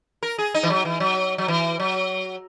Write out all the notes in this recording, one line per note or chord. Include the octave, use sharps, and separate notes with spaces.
A#4
G#4
D#4
E3
F#3
E3
F#3
F#3
E3
F#3